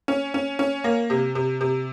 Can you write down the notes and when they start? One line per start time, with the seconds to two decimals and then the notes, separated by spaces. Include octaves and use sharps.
0.08 C#4
0.34 C#4
0.59 C#4
0.84 A#3
1.10 C3
1.35 C3
1.61 C3